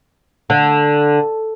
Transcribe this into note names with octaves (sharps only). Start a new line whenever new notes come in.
D3